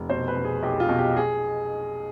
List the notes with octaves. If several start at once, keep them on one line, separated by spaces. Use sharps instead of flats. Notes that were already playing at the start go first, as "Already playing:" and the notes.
Already playing: F1
B2 C5
B4
B2
G#4
B1 G4
F4
B2
G4
G#4